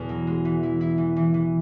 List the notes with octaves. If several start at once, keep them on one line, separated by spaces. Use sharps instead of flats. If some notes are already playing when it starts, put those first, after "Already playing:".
Already playing: E2 B2 B3
F#3
G#3
E3
E4
E4
E3
E3
E3